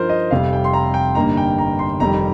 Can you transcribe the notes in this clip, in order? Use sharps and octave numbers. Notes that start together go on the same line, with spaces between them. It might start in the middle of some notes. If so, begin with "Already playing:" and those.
Already playing: G2 F3 D#4 F4 A#4 C5
D#5
F1 F2 C3 G3 F5
G5
C6
A#5
G5
G1 G2 G3 A#3 D#4 A#5
G5
A#5
C6
F1 F2 D#3 G3 C4 A#5